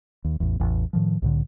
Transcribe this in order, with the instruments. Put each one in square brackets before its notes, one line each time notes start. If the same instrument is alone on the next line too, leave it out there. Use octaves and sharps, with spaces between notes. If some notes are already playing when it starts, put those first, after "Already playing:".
[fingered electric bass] D#2
A1 E2
A1 E2
A2 D#3 F3
C2 A2 D3